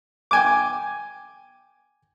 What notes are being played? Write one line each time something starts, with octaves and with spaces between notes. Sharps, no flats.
G5 G#5 D6